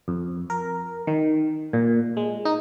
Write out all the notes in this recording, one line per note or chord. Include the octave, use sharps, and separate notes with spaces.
F2
A#4
D#3
A#2
G#3
D#4